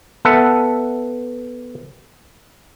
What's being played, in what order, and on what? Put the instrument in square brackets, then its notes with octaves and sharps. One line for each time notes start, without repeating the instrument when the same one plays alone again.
[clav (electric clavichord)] B3 A4 E5 F#5